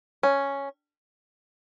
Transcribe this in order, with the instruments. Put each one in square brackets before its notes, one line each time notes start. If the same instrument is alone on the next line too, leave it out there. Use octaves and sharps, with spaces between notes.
[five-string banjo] C#4